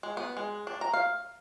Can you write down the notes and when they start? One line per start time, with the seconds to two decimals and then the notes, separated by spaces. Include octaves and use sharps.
0.03 G#3
0.17 B3
0.37 G#3
0.67 D4
0.81 A#5
0.94 F5